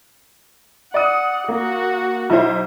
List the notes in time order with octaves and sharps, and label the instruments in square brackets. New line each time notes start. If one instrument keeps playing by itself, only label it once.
[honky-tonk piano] D5 D#6 [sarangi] F#5
[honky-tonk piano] A#3 [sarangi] F#4
[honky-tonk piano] B1 E4 C5